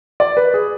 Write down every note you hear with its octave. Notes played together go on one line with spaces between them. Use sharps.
D5
B4
G#4